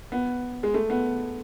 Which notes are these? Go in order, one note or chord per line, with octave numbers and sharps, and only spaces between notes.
B3
G#3
A3
B3